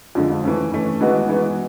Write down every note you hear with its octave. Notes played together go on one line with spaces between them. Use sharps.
F2 D3 F3 G#3
E3 A3 C#4
E3 A3 C#4
E3 G#3 B3 D#4 F#4
E3 G#3 B3 D#4 F#4